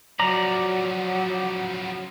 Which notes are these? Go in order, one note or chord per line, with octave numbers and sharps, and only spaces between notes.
C#3 F3 F#3 D5 A#5